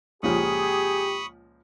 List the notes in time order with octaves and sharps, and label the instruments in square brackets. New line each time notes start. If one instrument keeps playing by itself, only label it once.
[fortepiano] C#2 A#2 F3 [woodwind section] G4 [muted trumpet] G#4 [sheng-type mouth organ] B5 C#6 D#6